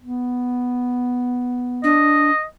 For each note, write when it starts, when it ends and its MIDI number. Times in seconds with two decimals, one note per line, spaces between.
0.01 1.96 59
1.84 2.30 62
1.84 2.44 75